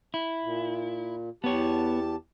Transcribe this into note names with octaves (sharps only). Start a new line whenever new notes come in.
E4
A#2
E2 B3 G4 C#5 A5